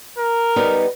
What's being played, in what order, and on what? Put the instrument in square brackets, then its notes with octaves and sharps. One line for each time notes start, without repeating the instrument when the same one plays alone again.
[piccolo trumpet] A#4
[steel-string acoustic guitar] G3 B3 D#4